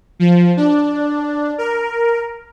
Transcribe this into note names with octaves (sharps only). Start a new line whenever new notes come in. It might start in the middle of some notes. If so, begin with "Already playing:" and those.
F3
D4
A#4